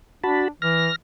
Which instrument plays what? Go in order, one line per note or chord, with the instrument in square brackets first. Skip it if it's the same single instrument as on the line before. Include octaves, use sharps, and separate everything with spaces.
[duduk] D4 [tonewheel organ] F#4 A5 B5
[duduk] E3 [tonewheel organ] F6 A#6